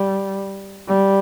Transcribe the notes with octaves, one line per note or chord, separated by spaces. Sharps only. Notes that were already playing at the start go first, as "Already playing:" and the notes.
Already playing: G3
G3